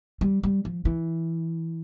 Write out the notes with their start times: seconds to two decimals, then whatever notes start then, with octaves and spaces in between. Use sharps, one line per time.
0.21 G3
0.43 G3
0.65 F3
0.85 E3